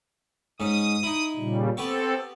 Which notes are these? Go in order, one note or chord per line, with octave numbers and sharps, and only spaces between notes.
G#2 C#4 D#6
D#4 E4
A#2 C#3 G3
B3 C4 G4 A4 C#6